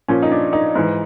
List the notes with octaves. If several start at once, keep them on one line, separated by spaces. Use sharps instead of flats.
A#2 F3 C#4
D#4
D4
D#4
G#2 E3